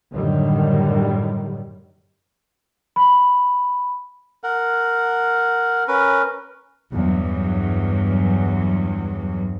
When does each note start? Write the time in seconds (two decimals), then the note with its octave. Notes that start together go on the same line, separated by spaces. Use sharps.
0.12 F#2 A2 D3 D#3 F#3 G3
2.96 B5
4.44 A#4 F#5
5.88 C#4 A#4 B4
6.92 E2 G2 F#3